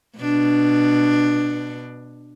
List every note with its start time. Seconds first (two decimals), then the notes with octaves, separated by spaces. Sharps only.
0.18 B2 D4